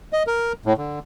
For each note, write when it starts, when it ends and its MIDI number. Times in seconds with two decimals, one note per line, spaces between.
0.13 0.23 75
0.27 0.53 70
0.66 0.73 45
0.78 0.99 50